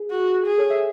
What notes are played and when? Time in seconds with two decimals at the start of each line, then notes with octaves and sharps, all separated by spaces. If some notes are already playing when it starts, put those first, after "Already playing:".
Already playing: G#4
0.11 F#4
0.47 G#4
0.58 A4 C#5
0.70 C#5 E5